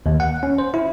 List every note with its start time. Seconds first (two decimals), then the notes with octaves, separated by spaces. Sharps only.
0.06 D#2
0.20 F#5
0.43 C#4
0.58 C5
0.74 E4